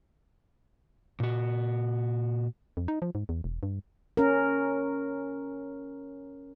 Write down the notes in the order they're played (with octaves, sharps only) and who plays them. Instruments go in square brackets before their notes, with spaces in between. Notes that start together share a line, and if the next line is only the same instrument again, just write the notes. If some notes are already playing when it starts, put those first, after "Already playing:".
[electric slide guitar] A#2 F#4
[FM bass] F2
D#4
F3
G#2
E2
E1
G2
[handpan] C#4 A#4